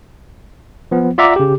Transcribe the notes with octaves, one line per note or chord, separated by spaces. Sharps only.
F3 B3
F4 D5 E5 F#5 A#5 D6
C#3 G4